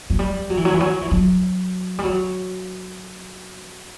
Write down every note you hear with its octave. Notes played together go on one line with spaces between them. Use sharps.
F#3
G3
F#3
E3
F#3
E3
F#3
E3
F#3
G3
F#3